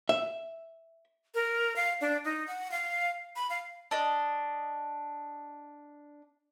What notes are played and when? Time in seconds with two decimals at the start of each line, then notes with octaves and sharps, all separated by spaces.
0.09 E5
1.35 A#4
1.76 F5
2.01 D4
2.25 D#4
2.47 F#5
2.71 F5
3.36 B5
3.50 F5
3.91 D4 D#5